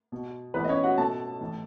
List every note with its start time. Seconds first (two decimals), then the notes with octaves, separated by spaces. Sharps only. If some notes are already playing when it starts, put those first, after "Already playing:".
0.12 B2
0.54 A2 E3 B3 B4
0.64 D#5
0.69 C#4 C#5
0.83 F#4 F#5
0.98 B2 A4 A5
1.41 A2 E3